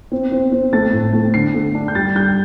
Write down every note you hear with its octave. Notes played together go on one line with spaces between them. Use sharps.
C4
C4
C4
A3 A6
A2
A3
D3 C7
A3
D4
G6
G3 A6
G3 G6